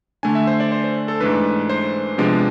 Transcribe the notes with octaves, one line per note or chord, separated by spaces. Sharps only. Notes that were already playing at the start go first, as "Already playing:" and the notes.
D3 A3 D4 G#5
E5
C5
D5
C5
C5
A4
G#2 E3 A3 D4 B4
C5
C3 F3 G#3 B3 D4